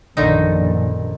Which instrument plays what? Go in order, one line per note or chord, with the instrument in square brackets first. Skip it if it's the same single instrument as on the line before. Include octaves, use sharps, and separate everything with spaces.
[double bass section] A#1 F#2 [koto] D3 D#3 D#4